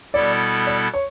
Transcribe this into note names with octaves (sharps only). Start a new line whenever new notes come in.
B2 G3 B3 E4 A4 D5
D5
C#5